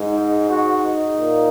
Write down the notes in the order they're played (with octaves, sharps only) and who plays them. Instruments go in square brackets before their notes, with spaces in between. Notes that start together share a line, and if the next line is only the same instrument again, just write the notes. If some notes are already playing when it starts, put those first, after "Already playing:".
Already playing: [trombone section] G#2 G#3
D#4
F#4
D#4
A#2 A#3